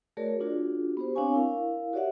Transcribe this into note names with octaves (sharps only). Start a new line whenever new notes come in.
A3 F#4 G#4 A#4 C#5 D5
D4 F4 F#4 G#4
B3 G4 C5
C4 D4 C#5 F5 G#5 C#6
E4 A#4 F5
F#4 G4 C#5 D5 E5 F#5